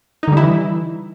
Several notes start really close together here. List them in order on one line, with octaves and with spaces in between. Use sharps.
D#4 D3 G3 E4 E3